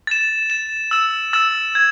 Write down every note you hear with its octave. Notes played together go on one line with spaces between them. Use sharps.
A6 E7
A6 E7
E6 A6 E7
E6 A6 E7
G#6